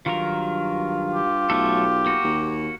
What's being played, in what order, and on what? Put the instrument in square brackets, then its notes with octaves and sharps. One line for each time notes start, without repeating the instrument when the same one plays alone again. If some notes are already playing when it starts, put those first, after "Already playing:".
[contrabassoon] G2 [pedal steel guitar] D#3 F#3 A#4 [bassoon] F4
[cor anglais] G4
[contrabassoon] B1 [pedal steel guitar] F#3 A3 A4
[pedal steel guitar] A#3 F#4
[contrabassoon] D#2